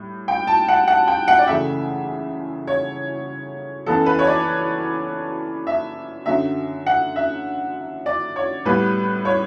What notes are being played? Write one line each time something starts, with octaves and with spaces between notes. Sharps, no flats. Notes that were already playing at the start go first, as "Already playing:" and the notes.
Already playing: A2 G3
G5
A5
F#5
F#5
G5
F#5
D5
F#2 C#3 E3 A3 E5
C#5
F#2 E3 B3 A4
B4
C#5
D5
E5
F#2 D3 F#3 E5
F#5
E5
D5
C#5
A2 G3 B3 B4
C#5